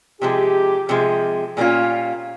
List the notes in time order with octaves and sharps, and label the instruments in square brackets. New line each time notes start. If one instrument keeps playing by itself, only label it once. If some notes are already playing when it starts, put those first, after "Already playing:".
[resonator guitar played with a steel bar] C3 F3 G#3 [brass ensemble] G4
[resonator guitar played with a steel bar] C3 F3 G#3
A#2 G3 A#3 C#4 F4